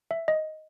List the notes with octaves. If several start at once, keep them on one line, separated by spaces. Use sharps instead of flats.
E5
D#5